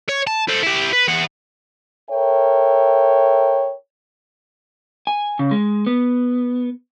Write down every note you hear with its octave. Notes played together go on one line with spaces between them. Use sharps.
C#5
A5
A4 C5
E4 G4
B4
E3 F#5
A4 A#4 C#5 E5 G5
G#5
C#3
G#3
B3